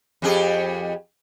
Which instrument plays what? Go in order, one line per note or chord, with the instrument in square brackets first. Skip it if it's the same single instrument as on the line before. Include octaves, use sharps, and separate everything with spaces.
[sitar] F2 G4 G#4